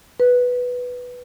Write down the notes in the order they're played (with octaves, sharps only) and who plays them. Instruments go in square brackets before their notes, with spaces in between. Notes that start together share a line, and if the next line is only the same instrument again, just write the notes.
[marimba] B4